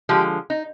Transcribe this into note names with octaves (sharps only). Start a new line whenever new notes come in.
D3 F3 G#3 G4
D#4